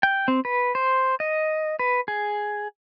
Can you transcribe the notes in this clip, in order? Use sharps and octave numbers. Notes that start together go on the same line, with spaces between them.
G5
C4
B4
C5
D#5
B4
G#4